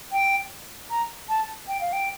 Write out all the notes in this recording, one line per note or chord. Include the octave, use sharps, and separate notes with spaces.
G5
A#5
A5
G5
F5
G5